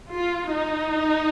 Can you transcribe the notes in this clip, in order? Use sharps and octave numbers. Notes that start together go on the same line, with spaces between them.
F4
D#4